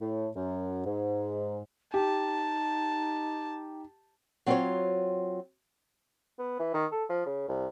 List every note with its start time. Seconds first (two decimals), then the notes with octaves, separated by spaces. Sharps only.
0.01 A2
0.36 F#2
0.86 G#2
1.94 D#4 G4 A5
4.46 F#3 C4 F4 F#4 C5 C#5
6.39 B3
6.59 E3
6.74 D#3
6.92 A4
7.10 F3
7.26 C#3
7.49 C2